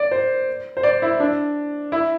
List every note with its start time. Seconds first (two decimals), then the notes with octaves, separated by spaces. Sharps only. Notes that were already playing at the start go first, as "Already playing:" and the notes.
Already playing: D5
0.11 C5
0.77 C5
0.83 D5
1.02 E4
1.20 D4
1.92 E4